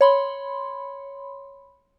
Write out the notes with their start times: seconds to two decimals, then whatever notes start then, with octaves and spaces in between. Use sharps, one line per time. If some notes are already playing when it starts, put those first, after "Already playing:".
0.01 C#5 B5 C6